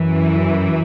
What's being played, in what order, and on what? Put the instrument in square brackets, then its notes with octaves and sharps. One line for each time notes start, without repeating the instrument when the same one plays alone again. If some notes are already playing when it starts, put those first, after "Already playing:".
Already playing: [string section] F#2 E3